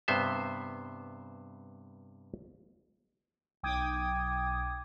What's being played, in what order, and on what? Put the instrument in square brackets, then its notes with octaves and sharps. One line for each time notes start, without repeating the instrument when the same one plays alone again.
[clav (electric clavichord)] G2 C3 B3 C5 E5
[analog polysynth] B1 G5 D6 D#6 G#6